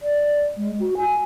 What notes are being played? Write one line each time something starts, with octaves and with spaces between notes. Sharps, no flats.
D5
G#3
F#4
G#5